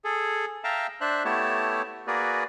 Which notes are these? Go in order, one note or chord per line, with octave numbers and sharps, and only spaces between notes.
G#4 A4
E5 F5 G5 A5 A#5
D4 C5 E5 F#6
A3 B3 E4 G4 C#5 A5
A#3 F#4 G#4 A#4 B4 D5